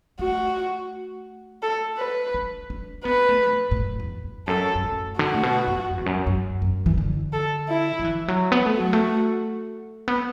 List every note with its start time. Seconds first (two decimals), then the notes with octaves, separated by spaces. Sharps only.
0.19 A3 F#4
1.63 A4
1.98 B4
2.34 D4
2.70 D4
3.05 B3 B4
3.29 A3
3.53 A2
3.71 A2
3.77 F#2
4.00 E2
4.24 E2
4.47 F#2 A4
4.75 F#2
4.84 A2
5.19 D3 F#4
5.34 A2
5.43 B2
5.67 F#2
5.91 F#2
5.98 E2
6.06 F#2
6.27 F#2
6.62 F#2
6.86 E3
6.98 D3
7.33 A4
7.69 E4
7.99 F#3
8.04 E3
8.28 F#3
8.52 B3
8.66 A3
8.76 F#3 F#4
8.93 A3
10.08 B3